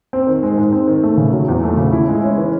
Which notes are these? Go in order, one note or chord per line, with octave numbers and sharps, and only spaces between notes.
C4
D#3
G#3
G#2
C4
D#3
A3
C#3
F#3
E2
A3
C#3
E4
G#3
C#4
E3